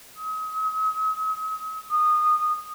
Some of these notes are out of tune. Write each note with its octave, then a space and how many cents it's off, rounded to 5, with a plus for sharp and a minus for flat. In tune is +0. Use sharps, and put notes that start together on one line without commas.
D#6 +45
D#6 -20